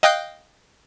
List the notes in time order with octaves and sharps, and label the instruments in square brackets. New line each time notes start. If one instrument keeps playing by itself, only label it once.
[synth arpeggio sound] D#5 F5 G5 D#6 F#6 G6